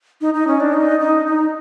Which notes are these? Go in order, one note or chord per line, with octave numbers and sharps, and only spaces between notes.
D#4
D#4
C#4
D4
D#4
D#4
D#4